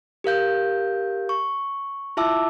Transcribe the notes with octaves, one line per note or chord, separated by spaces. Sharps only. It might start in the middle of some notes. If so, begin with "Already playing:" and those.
G4 A#4 F5 G6
C#6
E4 F4 E5 A5 D6 E6